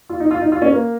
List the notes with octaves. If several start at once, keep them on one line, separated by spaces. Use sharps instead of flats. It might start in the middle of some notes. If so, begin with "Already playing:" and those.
F4
D#4
F4
D#4
F4
C#4
A#3